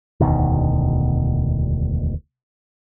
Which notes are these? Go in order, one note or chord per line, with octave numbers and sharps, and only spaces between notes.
E1 D2 B2 D#3